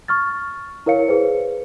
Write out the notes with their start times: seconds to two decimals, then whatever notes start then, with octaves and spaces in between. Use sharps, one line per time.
0.08 C#6 F6 A6
0.86 E4 A#4 C#5 F5 C#7
1.08 G#4 B4 C5